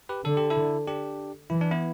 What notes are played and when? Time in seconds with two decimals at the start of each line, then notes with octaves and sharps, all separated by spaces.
0.09 G4 B4
0.25 D3 A4
0.37 G4
0.50 E4 A4
0.87 D4 G4
1.50 E3 E4
1.61 D4
1.71 B3 E4